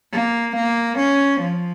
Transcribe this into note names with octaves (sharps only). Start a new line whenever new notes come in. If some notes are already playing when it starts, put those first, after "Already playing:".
A#3
A#3
C#4
F3